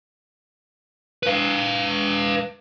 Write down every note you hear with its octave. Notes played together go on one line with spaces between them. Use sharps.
B4 F5